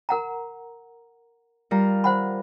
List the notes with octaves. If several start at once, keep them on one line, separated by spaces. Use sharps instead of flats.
A#4 F#5 A#5
G3 F4 A#4
C5 F#5 B5